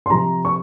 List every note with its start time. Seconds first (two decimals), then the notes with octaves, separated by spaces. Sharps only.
0.06 C6
0.10 C3 F3 A#5
0.45 C#6